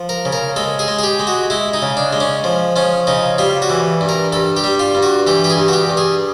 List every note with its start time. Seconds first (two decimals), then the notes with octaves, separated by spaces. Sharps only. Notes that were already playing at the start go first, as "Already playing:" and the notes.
Already playing: F3
0.09 A#4
0.25 C#3
0.32 A#4
0.56 G#3 A4
0.79 G#4
0.88 G#3
0.99 G#4
1.03 G4
1.19 G#3
1.27 F#4
1.50 G#3 E4
1.73 D#4
1.82 C#3
1.97 D4
2.13 G#3
2.20 C#4
2.44 F3
2.76 F3 C#4
3.07 C#3 D#4
3.38 G3 F4
3.62 F#4
3.70 E3
4.01 G2
4.09 A#4
4.32 G2 A4
4.57 G4
4.64 G3
4.79 F4
4.95 G2
5.03 F#4
5.27 E3 G4
5.44 G4
5.50 G#4
5.57 G2
5.68 F#4
5.73 G4
5.90 G2
5.97 G#4